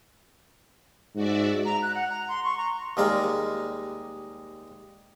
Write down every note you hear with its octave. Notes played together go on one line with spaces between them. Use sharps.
G#2 F#4 D5 E5
A#5
F#6
F#5
A#5
C6
C#6
A#5
D#2 G3 G#3 F5 A#5